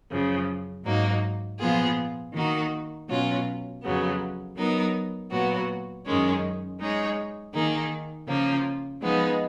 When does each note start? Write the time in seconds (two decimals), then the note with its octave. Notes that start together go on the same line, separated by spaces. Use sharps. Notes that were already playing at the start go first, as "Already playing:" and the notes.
0.11 F#2 C#3 F3
0.85 G#2 F#3 A#3 D#4
1.59 A#2 F3 B3 F4 G#4
2.33 D#3 A#3 D#4 F#4
3.08 B2 F#3 C#4 F4
3.82 F2 C#3 F#3 B3
4.56 F#3 B3 D#4 A#4
5.31 A#2 F#3 B3 F#4
6.05 F#2 D#3 G#3 C#4
6.79 G#3 D#4 G#4 C#5
7.54 D#3 A#3 D#4 G#4
8.28 C#3 F3 A#3 F4
9.02 F3 G#3 B3 D#4